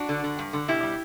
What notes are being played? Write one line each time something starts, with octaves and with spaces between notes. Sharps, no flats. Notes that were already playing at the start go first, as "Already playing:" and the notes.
Already playing: D4 F#4
D3
D3
G2
D3
B2 E4 G4
G3